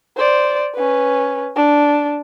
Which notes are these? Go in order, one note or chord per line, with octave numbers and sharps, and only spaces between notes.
C5 D5
C#4 B4
D4